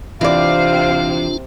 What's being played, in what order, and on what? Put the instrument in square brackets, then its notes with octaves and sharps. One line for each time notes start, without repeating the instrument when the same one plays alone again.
[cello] C3 C4 [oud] E3 D5 [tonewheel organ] D4 F4 [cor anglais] F5